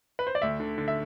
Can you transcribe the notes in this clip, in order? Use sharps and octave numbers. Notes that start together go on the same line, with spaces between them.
B4
C5
D5
D2 E5
D3
D3
E5